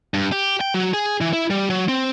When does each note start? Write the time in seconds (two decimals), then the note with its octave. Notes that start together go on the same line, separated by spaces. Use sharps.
0.14 G2
0.32 G4
0.61 G5
0.74 F#3
0.94 G#4
1.21 E3
1.33 E4
1.50 G3
1.70 F#3
1.88 C4